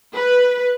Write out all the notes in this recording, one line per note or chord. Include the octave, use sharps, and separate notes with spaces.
B4